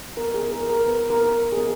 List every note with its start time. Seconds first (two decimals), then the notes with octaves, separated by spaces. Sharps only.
0.17 B3 A#4
0.34 G#4
0.52 E4 A#4
0.70 A#4
0.87 B3 B4
1.10 A#4
1.21 E4
1.52 G#4
1.57 B3 A#4